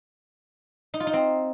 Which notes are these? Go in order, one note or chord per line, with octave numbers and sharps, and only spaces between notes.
D#4
F4
D#4
C4